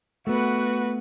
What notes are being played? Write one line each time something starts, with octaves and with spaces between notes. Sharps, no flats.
A3 B3 F#4 B4